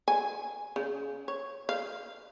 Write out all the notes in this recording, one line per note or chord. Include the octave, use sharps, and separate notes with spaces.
G#5
C#3
C#5
F5